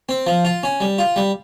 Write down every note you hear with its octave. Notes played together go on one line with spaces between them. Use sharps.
C4
F3
F4
C#4
G3
F4
G3